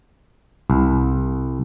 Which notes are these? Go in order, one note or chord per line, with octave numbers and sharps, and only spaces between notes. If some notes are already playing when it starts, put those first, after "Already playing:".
C2